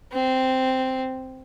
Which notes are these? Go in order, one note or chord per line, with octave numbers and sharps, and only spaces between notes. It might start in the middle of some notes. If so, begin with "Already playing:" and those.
C4